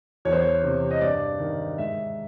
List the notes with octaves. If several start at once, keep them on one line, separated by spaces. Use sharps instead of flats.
E2 C#5
C5
C#5
C3 E3
D#5
G2 D5
D#3
G#2 E5